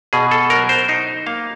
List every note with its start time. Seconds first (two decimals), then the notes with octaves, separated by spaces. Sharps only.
0.13 B2 G#4
0.31 A4
0.50 F#3 A#4
0.69 C5
0.88 D#4 C5
1.26 A#3 F5